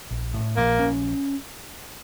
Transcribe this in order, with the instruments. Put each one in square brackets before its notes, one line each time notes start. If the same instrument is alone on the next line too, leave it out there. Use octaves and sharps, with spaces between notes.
[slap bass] A#1
A2
[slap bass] A#1 [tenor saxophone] A#3
[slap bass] C#4